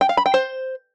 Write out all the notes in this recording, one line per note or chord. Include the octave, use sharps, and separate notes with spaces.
G5
F5
B5
G5
C5